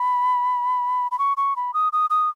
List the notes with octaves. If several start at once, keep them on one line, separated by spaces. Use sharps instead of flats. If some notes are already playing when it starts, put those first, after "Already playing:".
Already playing: B5
B5
C#6
C#6
B5
D#6
D#6
D#6